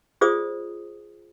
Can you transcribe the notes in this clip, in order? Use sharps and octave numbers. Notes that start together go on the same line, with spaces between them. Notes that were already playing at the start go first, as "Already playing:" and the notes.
F4 G#4 C5 D5 D#6